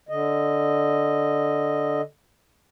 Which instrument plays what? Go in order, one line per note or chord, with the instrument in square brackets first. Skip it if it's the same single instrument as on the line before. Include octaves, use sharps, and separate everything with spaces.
[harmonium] D3 D#5